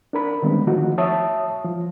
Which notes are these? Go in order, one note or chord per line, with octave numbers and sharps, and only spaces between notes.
D4 A#4 B5
D3 D#3 G3 G#3 B3 C4
D#3 F3 A3 D#4 F#4
C#5 E5 A5 D#6
F3